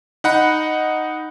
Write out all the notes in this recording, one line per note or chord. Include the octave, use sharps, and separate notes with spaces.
D#4 F#5 B5